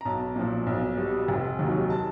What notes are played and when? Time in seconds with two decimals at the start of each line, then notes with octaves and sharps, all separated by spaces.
0.01 A#5
0.05 B1 A5
0.36 A#2 F3
0.66 B1
0.97 B2 G3
1.28 F1
1.59 D#2 D#3 F#3
1.90 A5